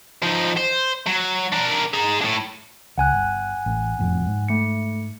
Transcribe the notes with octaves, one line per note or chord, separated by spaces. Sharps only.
F3 D#4
C5
F#3
D4 A#4
G#4 A#5
A2 D4
C#2 F#5 G#5 F#6
G1
A1
F#1 F2 A2
G#2
A3 C#7